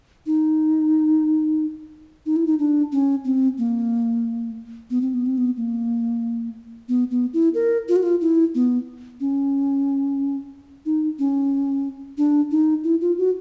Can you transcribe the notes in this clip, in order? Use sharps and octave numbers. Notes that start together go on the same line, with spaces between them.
D#4
D#4
E4
D#4
D4
C#4
C4
A#3
B3
C4
B3
C4
B3
A#3
B3
B3
E4
A#4
F4
F#4
F4
E4
B3
C#4
D#4
C#4
D4
D#4
E4
F4
F#4